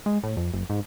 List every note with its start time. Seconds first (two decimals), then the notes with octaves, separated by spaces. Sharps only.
0.06 G#3
0.23 A2
0.37 F2
0.54 F#1
0.70 G#2